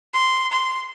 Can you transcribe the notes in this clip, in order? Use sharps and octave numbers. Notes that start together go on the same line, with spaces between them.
C6
C6